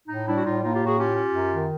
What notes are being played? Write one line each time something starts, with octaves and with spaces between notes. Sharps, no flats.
A2 D#4
G3 D4 E4
F#4
A2 D#4 F4
A#3 D#4 F4
F4 G4
A2
F#4 G#4
C#4 F4 G4
C#4
F#2
D#3